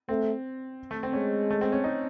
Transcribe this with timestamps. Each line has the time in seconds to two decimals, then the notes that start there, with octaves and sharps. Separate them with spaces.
0.09 A3 C4
0.91 A3
1.03 C4
1.13 G#3 C#4
1.50 A3
1.61 C4
1.72 C#4
1.84 D#4